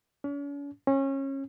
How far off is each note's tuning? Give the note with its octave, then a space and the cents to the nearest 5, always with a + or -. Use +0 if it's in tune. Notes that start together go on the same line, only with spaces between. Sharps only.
C#4 +45
C#4 -25